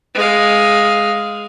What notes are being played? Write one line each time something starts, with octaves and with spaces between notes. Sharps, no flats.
G#3 F5